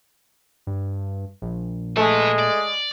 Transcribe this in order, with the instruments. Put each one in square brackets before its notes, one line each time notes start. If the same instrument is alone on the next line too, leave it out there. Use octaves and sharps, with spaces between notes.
[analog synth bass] G2
A#1
[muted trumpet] G#3 [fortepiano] A3 [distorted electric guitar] B4 E5
[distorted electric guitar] D5